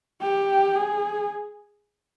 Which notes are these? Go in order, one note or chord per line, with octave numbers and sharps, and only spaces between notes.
G4
G#4